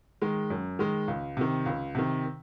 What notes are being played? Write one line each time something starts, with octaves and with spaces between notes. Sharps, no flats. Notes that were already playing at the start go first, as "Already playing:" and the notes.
D#3 G#3
F#2
D#3 G#3
C#2
C3 D#3
C#2
C3 D#3